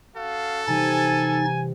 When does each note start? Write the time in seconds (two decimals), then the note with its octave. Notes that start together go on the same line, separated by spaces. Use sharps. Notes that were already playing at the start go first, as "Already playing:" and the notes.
0.16 C#4 F#4 A4 F5
0.67 C3 E3 G3 D#4 G#5 A6